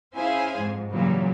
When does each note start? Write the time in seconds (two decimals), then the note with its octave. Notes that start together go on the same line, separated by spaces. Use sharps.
0.15 C#4 E4 G#4 C5 F5 G#5
0.57 F2 G#2
0.91 A#2 C#3 E3 F#3 G3 A#3